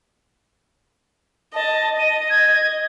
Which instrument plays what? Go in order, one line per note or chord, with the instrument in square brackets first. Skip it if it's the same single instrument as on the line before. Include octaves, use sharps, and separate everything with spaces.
[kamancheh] D#5 [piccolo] A5
[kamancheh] D#5 [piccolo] D#7
[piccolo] G#6